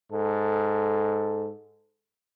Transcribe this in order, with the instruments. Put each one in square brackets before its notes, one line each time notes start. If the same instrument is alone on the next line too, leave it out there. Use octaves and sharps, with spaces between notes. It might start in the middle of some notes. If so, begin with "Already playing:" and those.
[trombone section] G#2 A4